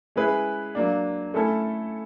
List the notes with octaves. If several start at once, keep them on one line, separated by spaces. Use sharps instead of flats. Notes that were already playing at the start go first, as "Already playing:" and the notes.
G#3 C#4 E4 G#4 B4
F#3 A#3 D4
A3 C#4 E4 A4